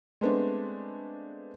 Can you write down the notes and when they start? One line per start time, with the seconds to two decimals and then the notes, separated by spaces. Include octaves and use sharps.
0.21 G#3 A3 B3 C4 D4